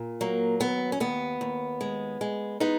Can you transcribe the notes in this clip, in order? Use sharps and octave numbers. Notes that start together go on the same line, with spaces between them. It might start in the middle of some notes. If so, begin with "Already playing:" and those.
Already playing: A#2
F#3 A#3
D#2 B3
C#4
D#2 B3
D#2
G#3
G#3
G#3 B3 D#4